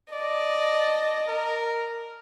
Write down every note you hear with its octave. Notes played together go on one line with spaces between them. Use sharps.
D5 D#5 A5
A#4